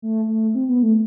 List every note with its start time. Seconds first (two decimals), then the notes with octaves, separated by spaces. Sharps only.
0.02 A3
0.28 A3
0.55 C4
0.69 B3
0.83 A3